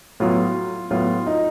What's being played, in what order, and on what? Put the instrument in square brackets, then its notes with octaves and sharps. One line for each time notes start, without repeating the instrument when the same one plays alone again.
[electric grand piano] A2 F#3 B3 [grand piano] F4
[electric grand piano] A2 F#3 B3 [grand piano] F4
[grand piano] D#4